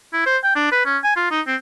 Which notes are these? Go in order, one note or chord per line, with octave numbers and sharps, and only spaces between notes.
E4
C5
G5
D4
B4
C#4
G#5
F4
D#4
C4